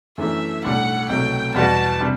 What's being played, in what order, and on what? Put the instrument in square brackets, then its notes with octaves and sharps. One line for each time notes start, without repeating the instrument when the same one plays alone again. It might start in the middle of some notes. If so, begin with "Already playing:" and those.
[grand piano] F#2 E3 A3 D4 [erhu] E5
[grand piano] B1 A2 G3 D4 [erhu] F#5
[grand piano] C2 B2 F#3 A3 [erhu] G5
[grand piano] E2 B2 G3 B3 F#4 [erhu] A5
[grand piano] C3 G3 D4